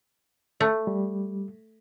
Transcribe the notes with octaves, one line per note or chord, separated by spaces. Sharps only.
A3
G3